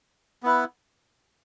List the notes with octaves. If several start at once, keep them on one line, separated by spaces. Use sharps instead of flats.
B3 E4 B4